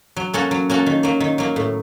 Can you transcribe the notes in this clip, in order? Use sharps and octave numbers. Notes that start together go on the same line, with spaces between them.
F#3
A#3 C#4 F#4 A4
F#3
A#3 C#4 F#4 A4
D#3
F#3 A#3
D#3
F#3 A#3
A2